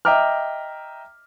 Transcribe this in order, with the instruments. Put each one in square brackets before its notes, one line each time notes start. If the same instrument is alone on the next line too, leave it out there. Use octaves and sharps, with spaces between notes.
[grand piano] D#5 E5 G5 A#5 D6 F6